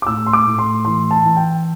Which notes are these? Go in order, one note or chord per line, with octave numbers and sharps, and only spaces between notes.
D6
A2 E6
C6
D6
A2
C6
E3 C6
A5
E3
G5